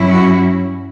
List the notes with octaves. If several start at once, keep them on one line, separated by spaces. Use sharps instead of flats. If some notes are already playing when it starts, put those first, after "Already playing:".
Already playing: G2 F#3 C#4 E4
F#4